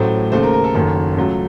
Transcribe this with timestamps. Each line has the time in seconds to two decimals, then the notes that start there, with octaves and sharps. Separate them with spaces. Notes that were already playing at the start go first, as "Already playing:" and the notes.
Already playing: A1 A2 F#3 A3 C5
0.32 D#2 C#3 A3 C5
0.43 A#4
0.53 A#4
0.64 A4
0.75 F#1 F#2 D#3
1.17 C#2 C#3 F#3 A3